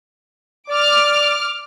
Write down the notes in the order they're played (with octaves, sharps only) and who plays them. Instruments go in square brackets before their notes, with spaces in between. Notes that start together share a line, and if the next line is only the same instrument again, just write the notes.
[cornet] D5 [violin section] D6 F6